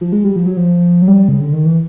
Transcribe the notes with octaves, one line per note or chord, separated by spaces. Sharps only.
F3
G#3
G3
F3
F#3
F3
F#3
G3
C#3
D3
D#3
E3